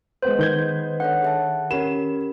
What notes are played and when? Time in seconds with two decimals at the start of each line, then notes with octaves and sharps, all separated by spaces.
0.22 G#3 B3 B4 C5
0.39 D#3 G6 G#6
1.00 D4 A4 C#5 F#5
1.22 G#4 E5 A5
1.71 C#4 G4 A#4 B5 E7